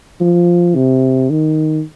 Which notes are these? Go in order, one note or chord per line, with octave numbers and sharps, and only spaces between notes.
F3
C3
D#3